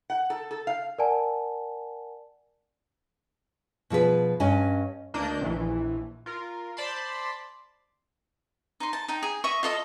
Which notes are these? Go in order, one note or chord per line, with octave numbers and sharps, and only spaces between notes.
F#5
A4
A4
F5
A#4 D5 F#5 G#5 A5
B2 F3 G#4 B4
G2 C#4 D4 D#5 G#5
D2 A#3 D4 D#5 G6
A#1 E3
F4 A#4
C5 D5 A5 B5 C6
D#4 C6
A5
D#4 G5
G#4
D#5 E5 C#6
F4 A4 D#5